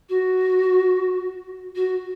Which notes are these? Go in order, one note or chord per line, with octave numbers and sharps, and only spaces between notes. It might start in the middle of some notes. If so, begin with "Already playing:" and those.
F#4
F#4